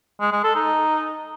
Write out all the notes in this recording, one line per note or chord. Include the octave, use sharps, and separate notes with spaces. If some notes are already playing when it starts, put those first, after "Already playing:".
G#3
G#3
A4
D#4